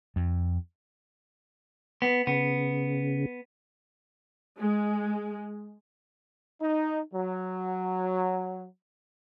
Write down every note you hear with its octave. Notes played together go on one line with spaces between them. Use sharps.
F2
B3
C#3 B3
G#3
D#4
F#3